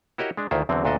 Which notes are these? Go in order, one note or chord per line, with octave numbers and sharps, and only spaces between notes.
E4 F#4 G4 A#4 C#5 D#5
G#3 D4
D2 D#3 E4 F4 C5
E2 D3 F#3 C4
D2 A#2 D4 A4 D#5